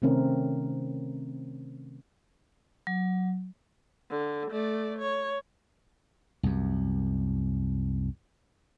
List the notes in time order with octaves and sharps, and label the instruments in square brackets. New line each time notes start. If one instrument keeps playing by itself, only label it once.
[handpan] C3 D#3 A3 C4 C#4 A#4
[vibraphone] F#3
[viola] D3
A3 D5
C#5
[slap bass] C2 F#2